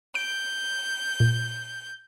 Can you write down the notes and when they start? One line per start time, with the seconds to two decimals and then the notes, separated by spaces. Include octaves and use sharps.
0.15 G6 D7
1.20 A#2